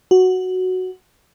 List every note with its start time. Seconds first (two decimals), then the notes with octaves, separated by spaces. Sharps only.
0.11 F#4